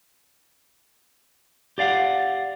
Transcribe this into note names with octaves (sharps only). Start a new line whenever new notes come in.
G4 D5 F5 F#5